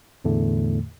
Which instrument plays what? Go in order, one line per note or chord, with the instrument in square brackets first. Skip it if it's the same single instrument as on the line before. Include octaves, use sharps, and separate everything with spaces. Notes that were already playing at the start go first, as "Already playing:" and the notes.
[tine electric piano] E2 A2 D3 A3